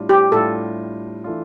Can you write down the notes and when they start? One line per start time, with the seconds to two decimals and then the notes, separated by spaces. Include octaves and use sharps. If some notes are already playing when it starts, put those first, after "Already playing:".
Already playing: A2 G3 D4 F4
0.09 G4
0.32 A2 G3 D4 F4 A4
1.24 E3 A3 D4 F4